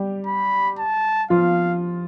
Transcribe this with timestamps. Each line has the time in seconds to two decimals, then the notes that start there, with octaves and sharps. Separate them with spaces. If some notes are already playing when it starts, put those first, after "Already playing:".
Already playing: G3 G4
0.27 B5
0.79 A5
1.30 F3 F4 F5